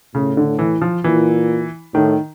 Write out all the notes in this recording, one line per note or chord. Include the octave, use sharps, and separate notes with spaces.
A2 C#3
D3
E3
F3
A#2 E3
A2 D#3